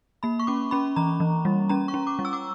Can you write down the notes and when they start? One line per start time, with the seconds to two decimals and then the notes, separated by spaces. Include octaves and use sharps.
0.23 A#3 B5
0.39 C#6
0.47 C#4 D6
0.71 C#4 B5
0.96 E3 A#5
1.20 E3
1.45 G3
1.69 C#4 A#5
1.88 C#6
1.94 C#4
2.07 D6
2.19 G3
2.25 E6
2.33 D6